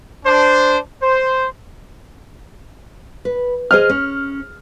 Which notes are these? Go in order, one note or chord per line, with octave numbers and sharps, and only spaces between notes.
D4 C5
C5
B4
G#4 C5 D#5 F6
C#4